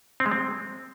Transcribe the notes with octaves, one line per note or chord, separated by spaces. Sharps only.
C4
G#3
C4